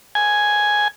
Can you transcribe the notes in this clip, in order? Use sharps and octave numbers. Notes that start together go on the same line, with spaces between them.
G#5